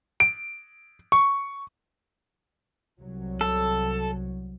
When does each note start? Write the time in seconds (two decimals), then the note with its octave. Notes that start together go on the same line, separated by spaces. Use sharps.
0.20 D7
1.12 C#6
3.00 C2 F#3
3.41 A4